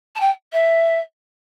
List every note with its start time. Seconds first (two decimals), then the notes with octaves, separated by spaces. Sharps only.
0.15 A5
0.20 G5
0.52 E5